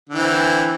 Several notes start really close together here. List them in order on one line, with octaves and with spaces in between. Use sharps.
D3 E3 C4